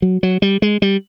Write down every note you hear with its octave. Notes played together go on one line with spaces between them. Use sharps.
F#3
F#3
G3
G#3
G3